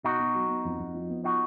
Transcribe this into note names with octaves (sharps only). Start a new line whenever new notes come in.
B2 D#4 F#4
B2
F#3
B3
F2
F2
F3
B3
D#4 F4 F#4